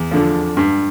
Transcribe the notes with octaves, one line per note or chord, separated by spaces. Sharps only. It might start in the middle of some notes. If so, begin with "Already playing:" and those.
Already playing: E2
D3 F3
G2